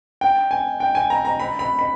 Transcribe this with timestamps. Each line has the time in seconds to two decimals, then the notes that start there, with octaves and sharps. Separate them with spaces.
0.21 G5
0.51 G#5
0.80 G5
0.95 G#5
1.10 A#5
1.25 A#5
1.40 B5
1.59 B5
1.79 B5